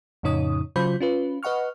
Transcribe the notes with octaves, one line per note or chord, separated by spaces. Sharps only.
F2 A2 C#3 D#4 C#5 D#6
C#3 F#3 F4 C5 B5 G6
C#4 F4 B4
B4 D#5 F#5 C#6 F6